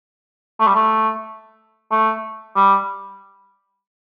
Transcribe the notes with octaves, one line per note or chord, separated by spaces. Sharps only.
A3
G3
A3
A3
G3